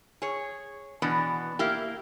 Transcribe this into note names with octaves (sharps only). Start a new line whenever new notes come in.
G#4 C#5
B2 E3 B3 D4
A#3 E4 G4